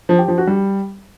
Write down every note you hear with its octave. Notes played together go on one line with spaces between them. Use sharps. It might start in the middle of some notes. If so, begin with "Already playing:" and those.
F3
G4
F3
F#4
G3